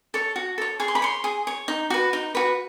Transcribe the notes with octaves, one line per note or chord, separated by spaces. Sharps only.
A4 C#5
F#4
A4 C#5
G#4 C#6
C6
B5
C#5 C6
G#4
C#5
D#4
F#4 B4
D#4
F#4 B4